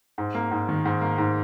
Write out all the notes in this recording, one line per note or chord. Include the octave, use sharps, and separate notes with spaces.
G#2
A#3
G#2
D#3
G#2
A#3
G#2